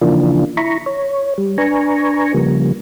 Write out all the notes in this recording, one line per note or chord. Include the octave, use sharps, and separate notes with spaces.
C#3 E3 F3 A#3 D4 F4
E4 A#5 B5 C#6
C#5
G3
D4 B4 G#5 A#5 C#6
C#3 F3 G3 A#3